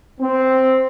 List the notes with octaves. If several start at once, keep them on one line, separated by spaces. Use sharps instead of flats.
C4